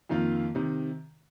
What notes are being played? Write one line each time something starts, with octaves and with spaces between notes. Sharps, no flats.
F2 D#3 A#3 F4
C3 D#3